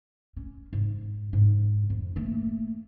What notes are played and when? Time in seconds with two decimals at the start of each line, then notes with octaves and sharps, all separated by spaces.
0.36 C#4
0.73 G#2
1.33 G#2
1.90 F2
2.16 A3 A#3